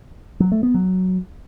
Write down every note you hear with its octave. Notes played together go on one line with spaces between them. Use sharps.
F#3
A3
B3
F#3